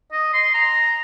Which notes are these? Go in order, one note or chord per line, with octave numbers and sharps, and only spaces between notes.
D#5
C6
A#5